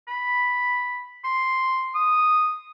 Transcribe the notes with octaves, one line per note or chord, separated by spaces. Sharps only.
B5
C6
D#6